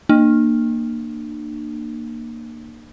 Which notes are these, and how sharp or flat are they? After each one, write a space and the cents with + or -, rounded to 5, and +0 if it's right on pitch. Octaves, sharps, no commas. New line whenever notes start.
A#3 +0 D4 +40